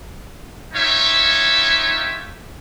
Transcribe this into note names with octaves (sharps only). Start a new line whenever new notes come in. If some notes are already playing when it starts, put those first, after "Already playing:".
D#4 F4 G4 C#5 E5